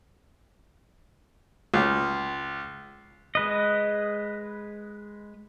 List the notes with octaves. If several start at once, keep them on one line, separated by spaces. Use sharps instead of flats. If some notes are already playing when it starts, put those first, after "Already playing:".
C#2
G#3 B4 D#5